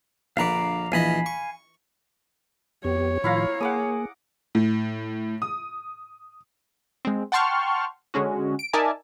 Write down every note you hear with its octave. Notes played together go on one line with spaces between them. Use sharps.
A#1 D3 B4 F5 A#5 D6
A#1 E3 D#5 F5 G#5 B5
C#6
F2 B3 G4 C#5
A2 D#3 F3 E4 F4 F5 A#5
A#3 G#4 F#5 D6 D#6
A2
D#6
G#3 C4
F#5 G5 A5 C6 C#6 F6
D3 G#3 C#4 F#4
D7
D#4 A#4 D5 E5 G#5 A5